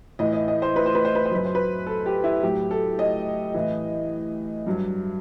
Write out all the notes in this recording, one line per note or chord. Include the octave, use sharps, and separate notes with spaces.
A2 E3 D#5
D#5
D#5
C5
B4
C5
B4
C5
B4
C5
F#2 F#3 B4
C5
B4
A4
G4
E4
A2 F#3 G4
A4
D#5
A2 E3
G2 F#3